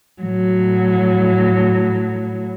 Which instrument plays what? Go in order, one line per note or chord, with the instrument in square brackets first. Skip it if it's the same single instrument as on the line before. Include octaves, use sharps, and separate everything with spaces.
[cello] A2 F#3